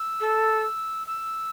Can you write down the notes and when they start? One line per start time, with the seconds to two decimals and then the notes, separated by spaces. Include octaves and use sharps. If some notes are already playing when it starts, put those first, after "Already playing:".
Already playing: E6
0.20 A4
1.07 E6